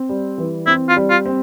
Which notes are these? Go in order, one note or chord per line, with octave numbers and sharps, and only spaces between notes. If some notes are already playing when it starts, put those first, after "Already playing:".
Already playing: C4
G3
E3
C4 E4
F4
G3
F4
C4